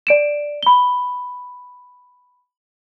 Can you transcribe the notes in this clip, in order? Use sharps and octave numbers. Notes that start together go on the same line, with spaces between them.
D5 D7 E7
B5 G7